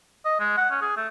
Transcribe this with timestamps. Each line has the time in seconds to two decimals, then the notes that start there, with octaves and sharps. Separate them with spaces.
0.25 D#5
0.40 G#3
0.57 F#5
0.71 C#4
0.82 G#4
0.97 A3